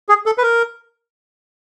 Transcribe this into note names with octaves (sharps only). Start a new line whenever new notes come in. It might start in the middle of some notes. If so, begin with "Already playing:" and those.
G#4
A4
B4
A#4